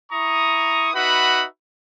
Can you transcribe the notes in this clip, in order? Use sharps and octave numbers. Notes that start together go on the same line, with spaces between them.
E4 A#5 C#6 D#6
D#4 F#4 B4 E5 F#5 B5